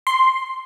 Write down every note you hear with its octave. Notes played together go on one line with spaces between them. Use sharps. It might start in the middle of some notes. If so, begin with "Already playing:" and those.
C6